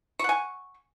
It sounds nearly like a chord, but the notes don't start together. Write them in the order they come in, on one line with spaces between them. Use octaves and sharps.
C#6 F#5 G#5